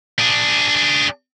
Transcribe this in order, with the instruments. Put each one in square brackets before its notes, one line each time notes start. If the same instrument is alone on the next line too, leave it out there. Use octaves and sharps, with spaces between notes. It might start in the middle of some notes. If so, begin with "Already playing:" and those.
[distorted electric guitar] D4 G#4